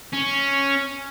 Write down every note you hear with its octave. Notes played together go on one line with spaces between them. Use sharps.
C#4